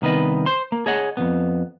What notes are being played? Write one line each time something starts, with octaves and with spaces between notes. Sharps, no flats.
C2 D#3 B3 B4 D#5
C5 C6
A#3
G#4 C#5 D#5 F#5
F2 B2 B3